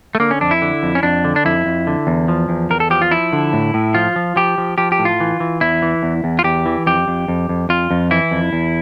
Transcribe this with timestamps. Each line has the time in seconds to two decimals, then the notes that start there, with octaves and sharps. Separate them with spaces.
0.15 A3
0.20 D3 A#3
0.31 C#4
0.41 F2 D4
0.51 E4
0.62 D3
0.83 F2
0.95 C#4
1.03 F2 D4
1.25 D3
1.36 D4
1.45 F2 E4
1.66 F2
1.87 D3
2.07 E2
2.28 F3
2.49 E2
2.70 E2 A#4
2.80 A4
2.90 F3 G4
3.02 F4
3.11 F3 E4
3.33 D3
3.53 A2
3.74 A2
3.94 F3 F4
4.16 F3
4.36 F3 G4
4.58 F3
4.78 F3 G4
4.92 G4
4.99 A2
5.05 F4
5.20 E3
5.40 E3
5.61 E2 E4
5.82 E3
6.03 E2
6.24 E2
6.39 F4
6.44 E2 G4
6.66 E3
6.86 F2 G4
7.08 F2
7.28 F2
7.49 F2
7.69 F2 F4
7.91 F2
8.11 E3 E4
8.31 F2
8.53 E2